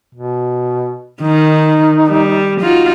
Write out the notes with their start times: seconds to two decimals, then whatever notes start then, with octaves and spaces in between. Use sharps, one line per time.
0.15 B2
1.22 D#3 D#4
2.08 G3
2.61 D#4 F4 F#4